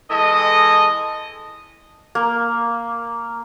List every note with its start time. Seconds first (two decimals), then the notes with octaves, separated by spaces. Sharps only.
0.10 E3 G#3 A4 D#5
2.15 A#3